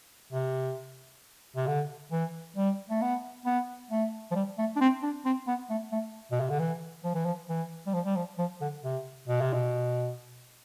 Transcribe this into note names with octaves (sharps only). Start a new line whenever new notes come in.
C3
C3
D3
E3
G3
A3
B3
B3
A3
F3
G3
A3
D4
C4
D4
C4
B3
A3
A3
B2
C3
D3
E3
F3
E3
F3
E3
G3
F3
G3
F3
F3
D3
C3
B2
C3
B2